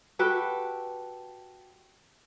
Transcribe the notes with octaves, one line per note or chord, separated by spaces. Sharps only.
F#4 G4 A4 B4